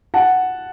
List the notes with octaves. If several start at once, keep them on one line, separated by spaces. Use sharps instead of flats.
F#5 A5